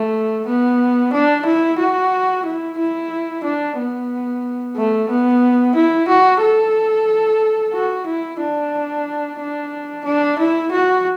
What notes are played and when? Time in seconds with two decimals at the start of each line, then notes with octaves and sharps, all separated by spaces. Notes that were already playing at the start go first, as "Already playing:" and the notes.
Already playing: A3
0.46 B3
1.13 D4
1.45 E4
1.79 F#4
2.45 E4
2.79 E4
3.44 D4
3.78 B3
4.76 A3
5.09 B3
5.75 E4
6.08 F#4
6.42 A4
7.74 F#4
8.07 E4
8.41 D4
9.39 D4
10.05 D4
10.39 E4
10.72 F#4